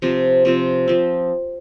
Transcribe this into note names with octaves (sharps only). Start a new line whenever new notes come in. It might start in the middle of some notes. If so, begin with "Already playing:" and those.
C3 F3 C4
C3 F3 C4
F3 C4